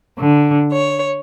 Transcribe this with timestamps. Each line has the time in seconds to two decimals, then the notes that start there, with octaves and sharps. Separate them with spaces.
0.19 D3
0.71 C#5